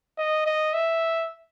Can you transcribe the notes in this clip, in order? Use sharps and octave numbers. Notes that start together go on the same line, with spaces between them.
D#5
D#5
E5